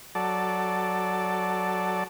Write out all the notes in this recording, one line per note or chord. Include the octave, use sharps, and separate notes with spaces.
F#3 A4 D5